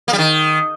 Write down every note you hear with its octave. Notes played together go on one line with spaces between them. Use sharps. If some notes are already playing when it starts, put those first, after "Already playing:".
A#3
G3
D#3